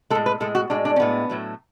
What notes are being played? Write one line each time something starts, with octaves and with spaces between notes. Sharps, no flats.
A2 G#3 A4
B4
A2 G#3 A4
F#4
A2 G#3 D4
D4
C#4
A2 G#3 B3
A2 F#3 A3